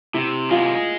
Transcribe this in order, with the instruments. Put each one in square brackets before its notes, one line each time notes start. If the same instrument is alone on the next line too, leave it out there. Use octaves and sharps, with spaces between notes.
[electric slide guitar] C3 [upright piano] E4
[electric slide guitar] G#3 [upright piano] F4